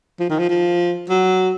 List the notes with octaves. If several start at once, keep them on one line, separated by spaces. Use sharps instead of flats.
F3
D#3
F3
F3
F#3